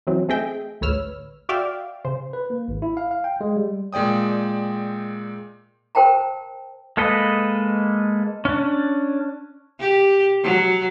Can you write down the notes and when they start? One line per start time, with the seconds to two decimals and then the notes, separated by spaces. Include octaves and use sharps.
0.07 E3 F#3 C4 C#4
0.29 A3 C4 G#4 D#5 E5 G5
0.81 A1 D2 B4 C#5 E6 F6
1.49 F#4 D5 E5 F5 G5
2.05 C#3 C5
2.33 B4
2.50 A#3
2.68 G#1
2.82 E4
2.97 F5
3.11 F5
3.24 G5
3.41 G#3
3.56 G3
3.93 A#2 G#3 D5 G5 D#6
5.95 A#4 C5 G5 A5 A#5
6.97 G#3 A#3 A4 B4 D#5
8.45 C#4 D4
9.79 G4
10.43 F#3